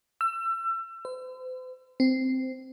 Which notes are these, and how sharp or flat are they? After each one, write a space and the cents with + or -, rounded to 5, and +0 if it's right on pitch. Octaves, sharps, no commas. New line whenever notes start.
E6 +30
C5 -45
C4 -10